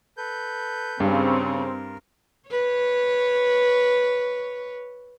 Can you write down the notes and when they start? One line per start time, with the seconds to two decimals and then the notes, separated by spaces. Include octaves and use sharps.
0.17 A4 B4 G6
1.00 G2 C#3 C4 A#4
2.49 B4 C#5